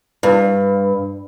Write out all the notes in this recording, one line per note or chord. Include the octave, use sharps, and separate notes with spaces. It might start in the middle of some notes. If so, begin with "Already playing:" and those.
G2